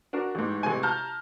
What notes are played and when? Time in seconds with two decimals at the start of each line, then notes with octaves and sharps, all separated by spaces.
0.13 D4 F#4 A#4
0.35 A1 G#2
0.63 A1 C3 G#3 G#5
0.83 A5 A#5 F6 G6